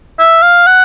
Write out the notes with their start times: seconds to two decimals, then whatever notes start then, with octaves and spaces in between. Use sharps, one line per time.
0.19 E5
0.42 F5
0.67 F#5